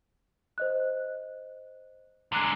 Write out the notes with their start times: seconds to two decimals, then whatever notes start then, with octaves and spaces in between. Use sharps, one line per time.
0.58 C5 D#5 F#6
2.32 D3 G#3 A#5 F#6 C7